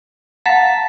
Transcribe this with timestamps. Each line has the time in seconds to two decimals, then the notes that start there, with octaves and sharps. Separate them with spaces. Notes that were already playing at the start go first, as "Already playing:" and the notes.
0.46 F5 F#5 A5 A#5 B6